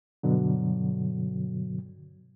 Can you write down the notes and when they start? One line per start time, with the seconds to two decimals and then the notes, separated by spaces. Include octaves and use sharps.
0.23 G2 B2 D3 F#3